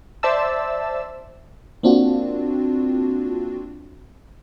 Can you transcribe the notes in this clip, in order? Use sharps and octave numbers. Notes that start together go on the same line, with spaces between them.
C5 D5 E5 A5 E6
A#3 C4 D4 F4 F#4